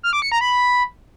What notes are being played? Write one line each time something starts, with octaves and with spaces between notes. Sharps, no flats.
F6
D6
C#7
A#5
B5